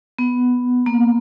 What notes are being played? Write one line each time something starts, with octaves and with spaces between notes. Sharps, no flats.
B3
A#3